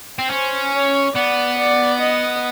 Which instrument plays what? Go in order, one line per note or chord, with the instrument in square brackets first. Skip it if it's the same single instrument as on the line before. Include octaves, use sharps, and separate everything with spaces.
[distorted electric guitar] C4
[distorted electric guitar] C#4 [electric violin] C5
[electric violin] C#5
[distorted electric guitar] B3 [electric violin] D5
[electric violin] D5
D#5